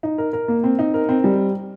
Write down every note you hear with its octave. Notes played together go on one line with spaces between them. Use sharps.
D#4
A#4
A#4
A#3
C4
D#4
A#4
C4
G3